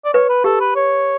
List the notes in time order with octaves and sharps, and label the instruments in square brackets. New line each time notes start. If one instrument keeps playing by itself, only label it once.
[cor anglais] D5
[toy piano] B4 [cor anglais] C#5
[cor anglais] B4
[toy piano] G4 [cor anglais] A4
[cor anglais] B4
C#5